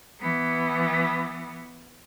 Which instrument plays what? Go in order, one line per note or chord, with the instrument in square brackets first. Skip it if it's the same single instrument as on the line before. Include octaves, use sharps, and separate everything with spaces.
[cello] E3 B3